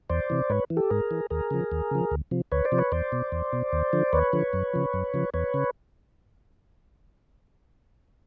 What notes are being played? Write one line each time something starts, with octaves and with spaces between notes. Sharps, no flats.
E2 C5 D5
C3 E3
G#2 B4 C#5
E3
G4 A4
G#2 G#4 A#4
E3
D#2 G#4 A#4
C#3 F3
D#2
C#3 F3
D2
C3 F3
D2 B4 C#5
C5 D5
C3 F3
B4 C#5
E2 C5 D5
B2
E2
B2
D#2
D3 F3
D#2 B4 C#5
D3 F3
F#2
C#3 F3
F#2
C#3 F3
E2 B4 C#5
C#3